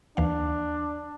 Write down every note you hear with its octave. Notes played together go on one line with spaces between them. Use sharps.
D#2 E3 D4 F5